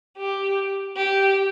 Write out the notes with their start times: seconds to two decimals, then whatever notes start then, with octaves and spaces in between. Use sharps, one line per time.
0.18 G4
0.97 G4